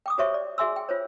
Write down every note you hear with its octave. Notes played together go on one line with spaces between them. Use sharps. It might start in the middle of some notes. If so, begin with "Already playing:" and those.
G5 D6 D#6
F#4 G4 C5 C#5 E5 C#6
D5
F#4 G#4 E5 G#5 C6 E6
G5
F4 C5 C#5